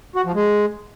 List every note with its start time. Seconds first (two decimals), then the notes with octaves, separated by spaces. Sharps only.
0.16 F#4
0.25 F3
0.34 G#3